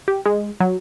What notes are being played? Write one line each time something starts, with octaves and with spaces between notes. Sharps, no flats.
G4
G#3
F#3